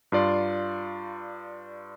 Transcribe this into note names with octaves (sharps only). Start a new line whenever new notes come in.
G2 F4 D5 C6